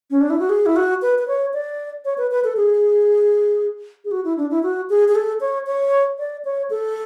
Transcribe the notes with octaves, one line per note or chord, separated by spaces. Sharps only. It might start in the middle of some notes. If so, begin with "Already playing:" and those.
C#4
D4
E4
F#4
G#4
E4
F#4
B4
B4
C#5
D5
C#5
B4
B4
A4
G#4
G#4
F#4
E4
D4
E4
F#4
G#4
G#4
A4
C#5
C#5
D5
C#5
A4